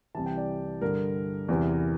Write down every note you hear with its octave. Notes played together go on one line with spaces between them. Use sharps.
C2 C3 E3 A5
G5
D5
G2 D3 A#4
E2 C3 E3